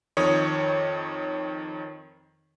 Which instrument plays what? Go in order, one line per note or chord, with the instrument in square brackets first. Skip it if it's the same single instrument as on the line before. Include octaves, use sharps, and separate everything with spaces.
[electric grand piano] F2 D#3 C#5 D#6